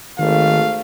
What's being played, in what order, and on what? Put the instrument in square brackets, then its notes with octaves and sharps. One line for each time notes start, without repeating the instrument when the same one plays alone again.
[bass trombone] G#1 [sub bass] D#3 [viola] A3 [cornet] F5